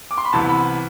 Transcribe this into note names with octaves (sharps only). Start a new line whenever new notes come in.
D6
C6
B5
C2 C3 E3 B3 A5
B5